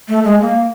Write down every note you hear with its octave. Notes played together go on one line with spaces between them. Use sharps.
A3
G#3
A#3